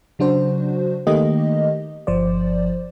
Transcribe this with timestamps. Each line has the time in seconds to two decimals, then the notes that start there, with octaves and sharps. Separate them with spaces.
0.19 C#3 F#3 D4 F#4 C5
1.07 D#3 A3 A#3 D#4 G4 D#5
2.07 G1 F3 C5 D5